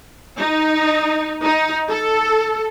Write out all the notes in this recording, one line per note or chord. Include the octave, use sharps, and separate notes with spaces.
D#4
D#4
A4